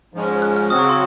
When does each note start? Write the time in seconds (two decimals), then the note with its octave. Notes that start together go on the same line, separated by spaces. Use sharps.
0.14 G#2 F3 G#3 C#4
0.42 F#6
0.57 F6
0.70 C#3 F#3 C4 F#4 D#6
0.79 C#6
0.89 C6